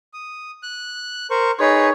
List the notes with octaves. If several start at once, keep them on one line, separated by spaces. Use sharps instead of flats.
D#6
F#6
A#4 C5 C#6
D#4 G#4 B4 C#5